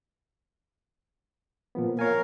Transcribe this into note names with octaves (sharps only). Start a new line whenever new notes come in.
A#2 F3 B3
A#4 C#5 F5 G#5